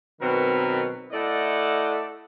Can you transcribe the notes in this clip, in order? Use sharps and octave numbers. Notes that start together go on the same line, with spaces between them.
B2 D#3 F#3 C4 A#4 B4
A3 E4 A4 D5 D#5 F#5